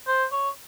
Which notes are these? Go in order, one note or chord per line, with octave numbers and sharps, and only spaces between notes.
C5
C#5